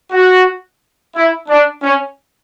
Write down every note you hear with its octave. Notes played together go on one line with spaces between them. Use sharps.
F#4
E4
D4
C#4